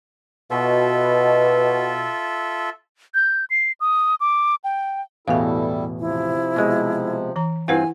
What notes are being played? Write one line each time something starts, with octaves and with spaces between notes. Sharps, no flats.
B2 F4 A4 E5
G6
C7
D#6
D6
G5
A1 E2 B2 G3 E4 A4 F5 G#5
C3 F3 E4
B2 G#3
E3 A#5
G2 C4 E4 F4 B4 F#5 G#5